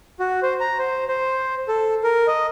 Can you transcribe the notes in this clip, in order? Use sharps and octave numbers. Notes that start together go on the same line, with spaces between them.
F#4
C5
A#5
C5
C5
A4
A#4
D#5